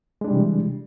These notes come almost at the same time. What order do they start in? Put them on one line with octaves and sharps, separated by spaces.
G#3 D4 G3 C3 E3